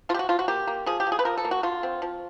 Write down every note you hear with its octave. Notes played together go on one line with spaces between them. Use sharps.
F3 F4
G4
F#4
F3 F4
F#4
A#3 G4
A#3
F3 G#4
G4
F3
G#4
B4
F3 A#4
A4
A#3
F#4
D3 F4
C4
F3